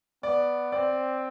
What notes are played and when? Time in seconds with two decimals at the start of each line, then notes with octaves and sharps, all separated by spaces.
0.23 B3 D5
0.72 C4 D5